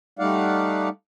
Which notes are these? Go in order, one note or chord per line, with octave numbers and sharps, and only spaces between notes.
G3 A3 D#4 D5 F5 F#5